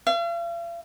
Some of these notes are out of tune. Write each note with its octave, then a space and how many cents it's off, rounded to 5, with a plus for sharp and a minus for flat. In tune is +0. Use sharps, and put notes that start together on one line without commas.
F5 -45